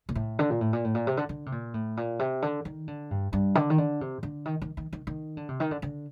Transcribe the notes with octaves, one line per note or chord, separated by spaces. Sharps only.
A#2
A2
D3
A#2
A2
A#2
A2
A#2
C3
D3
D3
C3
A#2
A2
A#2
C3
D3
D#3
D3
G2
G2
D3
D#3
D3
C3
D3
D#3
D#3
D#3
D#3
D#3
D3
C3
D#3
D3
D3